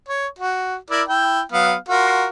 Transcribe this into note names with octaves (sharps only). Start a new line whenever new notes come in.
C#5
F#4
E4 A#4 D5
E4 G5
F#3 B3 F5
F4 F#4 A#4